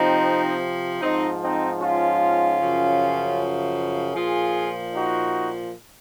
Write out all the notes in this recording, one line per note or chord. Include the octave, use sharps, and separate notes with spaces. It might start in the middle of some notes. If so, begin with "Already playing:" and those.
Already playing: C3 F3 C4 D#4
G#2 F3 C4 D#4
C4 D#4
C#4 F4
F#2 C#3 F3
A#2 F3 F4 G#4
D#4 F#4